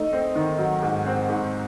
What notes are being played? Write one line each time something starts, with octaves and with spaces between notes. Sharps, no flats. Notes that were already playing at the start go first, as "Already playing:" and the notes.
Already playing: A3 D#4
C4
D#3
F#3
G#2
C4
G#2